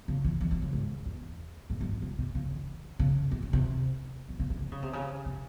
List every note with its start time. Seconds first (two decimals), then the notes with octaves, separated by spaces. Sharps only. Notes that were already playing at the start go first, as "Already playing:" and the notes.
0.08 C#3
0.24 E3
0.41 E3
0.51 E3
0.62 C#3
0.73 G#2
1.06 E2
1.70 G#2
1.81 G2
1.92 G#2
2.02 C3
2.18 C3
2.35 C#3
2.51 E3
2.99 C#3
3.31 C3
3.43 C3
3.53 C3
4.29 E3
4.39 C#3
4.50 C#3
4.61 E3
4.72 C#3
4.82 C3
4.93 C#3
5.26 C3